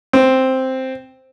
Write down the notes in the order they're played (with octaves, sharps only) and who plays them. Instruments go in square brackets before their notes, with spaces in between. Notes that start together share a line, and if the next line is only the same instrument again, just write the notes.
[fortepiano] C4